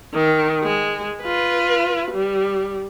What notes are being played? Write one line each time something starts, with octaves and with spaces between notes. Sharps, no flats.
D#3
G#3
F4 B4
G3